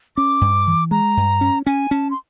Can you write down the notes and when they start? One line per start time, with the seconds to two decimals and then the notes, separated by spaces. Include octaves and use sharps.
0.17 C#4 D6
0.41 G2
0.67 E3
0.91 G#3 A#5
1.17 G2
1.41 C#4
1.66 C#4 G#5
1.91 C#4 A5
2.11 C6